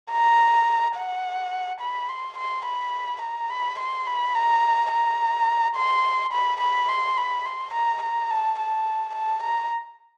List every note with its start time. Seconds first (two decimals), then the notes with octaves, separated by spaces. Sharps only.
0.12 A#5
0.96 F#5
1.81 B5
2.09 C6
2.38 C6
2.66 B5
3.22 A#5
3.50 B5
3.79 C6
4.07 B5
4.35 A#5
4.92 A#5
5.76 C6
6.33 B5
6.61 B5
6.89 C6
7.17 B5
7.46 C6
7.74 A#5
8.02 A#5
8.30 A5
8.59 A5
9.15 A5
9.43 A#5